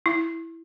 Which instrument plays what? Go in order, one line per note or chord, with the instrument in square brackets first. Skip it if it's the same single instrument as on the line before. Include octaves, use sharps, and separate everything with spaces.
[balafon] E4